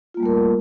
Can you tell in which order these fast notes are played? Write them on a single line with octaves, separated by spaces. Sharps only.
F4 A#3 G3 A3 A#4